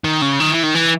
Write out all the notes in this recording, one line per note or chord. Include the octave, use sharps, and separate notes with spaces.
D#3
C#3
D#3
E3
D#3
E3